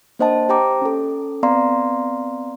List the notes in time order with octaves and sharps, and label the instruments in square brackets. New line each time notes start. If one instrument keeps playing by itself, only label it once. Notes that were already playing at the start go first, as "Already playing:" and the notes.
[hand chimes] A#3 D4 C5 D#5 F#5 A5
G4 C5 G5 A#5 D6
C#4 A4
B3 C4 D5 F5 A#5 C6